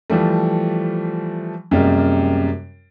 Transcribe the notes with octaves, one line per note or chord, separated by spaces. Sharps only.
E3 F3 G3 A3
F#2 C3 G3 G#3 A#3